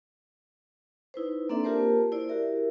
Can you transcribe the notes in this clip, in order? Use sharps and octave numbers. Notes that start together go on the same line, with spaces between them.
D#4 E4 B4 C5
A#3 C4 D4 A4 D5 E5
A#3 F4 G4 A#4 C5 A5
E4 C5 D5
E4 F#4 G4 A#4 E5